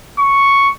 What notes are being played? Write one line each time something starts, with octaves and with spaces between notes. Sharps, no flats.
C#6